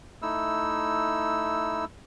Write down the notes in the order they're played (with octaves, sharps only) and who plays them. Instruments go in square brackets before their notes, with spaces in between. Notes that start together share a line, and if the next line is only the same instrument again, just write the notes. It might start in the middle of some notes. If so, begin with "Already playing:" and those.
[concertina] A3 D#4 E4 E6